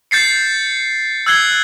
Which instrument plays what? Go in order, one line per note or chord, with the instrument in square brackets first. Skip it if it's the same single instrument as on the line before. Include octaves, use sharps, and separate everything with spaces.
[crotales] G6 A6 C7 C#7
E6 F#6 G#6 C7 G7